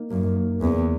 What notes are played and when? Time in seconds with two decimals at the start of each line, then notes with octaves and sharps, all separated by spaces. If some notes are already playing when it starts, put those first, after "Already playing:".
Already playing: A#3 D#4
0.10 F#2 A#3
0.36 A#3
0.62 E2 C#3